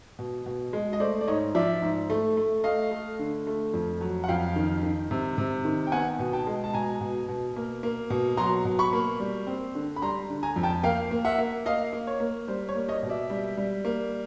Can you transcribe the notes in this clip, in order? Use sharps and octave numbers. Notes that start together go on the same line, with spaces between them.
B2
B2
G#3
D#5
A3 C5 D5
D5
G#2 C#5 D#5
F3 D5 E5
G#2
A3
A3
A3 D#5 F5
A3
D3
A3
F2
F#3
F#5
F2 F5 G5
D#3
D#3
C3
C3
D#3
G5
B3 F#5 G#5
B2
G5 A5
G#3
A5
B2 G#5 A#5
B2
B2
A#3
A#3
B2
F#3 A#5 C6
B2
B5 C#6
A#3
G3
C4
D3
B5
G3 A#5 C6
D3
G#5 A#5
F2
G5 A5
A#3 F5 G5
A#3
E5 F#5
A#3
A#3 D#5 F5
A#3
C#5
A#3
G3 C5
C#5
A#3
C#5 D#5
B2
D5 E5
G3
G3
A#3